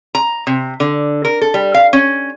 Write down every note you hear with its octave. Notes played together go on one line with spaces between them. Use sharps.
A#5
C3
D3
A#4
A4
G3
F5
C#4